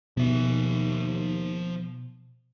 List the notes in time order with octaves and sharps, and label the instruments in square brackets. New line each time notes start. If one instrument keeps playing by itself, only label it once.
[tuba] D#2 [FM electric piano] B2 [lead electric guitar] F3 E5